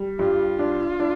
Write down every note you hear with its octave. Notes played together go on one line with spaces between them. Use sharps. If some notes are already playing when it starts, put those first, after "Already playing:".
Already playing: G3
G2 F4
D4
D4